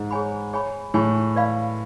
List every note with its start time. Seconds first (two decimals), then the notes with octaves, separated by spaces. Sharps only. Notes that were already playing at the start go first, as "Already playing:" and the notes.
Already playing: G#2
0.11 G#4 C#5 G#5 B5
0.53 G#4 C#5 G#5 B5
0.94 A2 G#4 C#5 G#5 B5
1.35 B4 D5 F5 B5